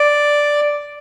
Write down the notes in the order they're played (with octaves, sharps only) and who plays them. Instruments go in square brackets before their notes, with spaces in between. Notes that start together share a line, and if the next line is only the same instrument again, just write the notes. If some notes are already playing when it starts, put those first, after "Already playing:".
Already playing: [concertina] D5